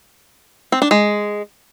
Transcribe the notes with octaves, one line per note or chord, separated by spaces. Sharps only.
C4
D4
G#3